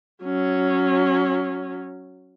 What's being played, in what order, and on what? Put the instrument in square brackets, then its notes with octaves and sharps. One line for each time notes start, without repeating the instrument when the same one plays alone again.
[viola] F#3 C#4